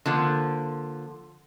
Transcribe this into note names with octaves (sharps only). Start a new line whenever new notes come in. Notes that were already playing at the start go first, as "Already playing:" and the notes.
D3 F3 A#3